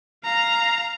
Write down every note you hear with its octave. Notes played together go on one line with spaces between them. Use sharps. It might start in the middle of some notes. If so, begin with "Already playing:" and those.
F5 A#5